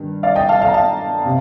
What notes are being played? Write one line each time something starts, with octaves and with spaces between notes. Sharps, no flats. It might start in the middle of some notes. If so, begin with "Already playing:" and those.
Already playing: G2 D#3
D5 F5
D#5 G5
F5 A5
F5 A5
A#5
F5 A5
C3